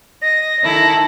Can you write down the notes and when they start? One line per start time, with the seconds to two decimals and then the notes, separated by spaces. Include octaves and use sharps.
0.22 D#5 A#6
0.62 D#3 E4 A4